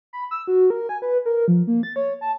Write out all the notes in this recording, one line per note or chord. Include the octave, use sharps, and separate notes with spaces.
B5
E6
F#4
A#4
G#5
B4
A#4
F3
A#3
A6
C#5
A5